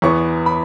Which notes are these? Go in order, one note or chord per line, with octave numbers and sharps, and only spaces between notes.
E2 E3 B3 C#6
B5